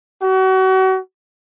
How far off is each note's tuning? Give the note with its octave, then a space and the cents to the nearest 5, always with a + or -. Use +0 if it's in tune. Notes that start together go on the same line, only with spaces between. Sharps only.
F#4 +35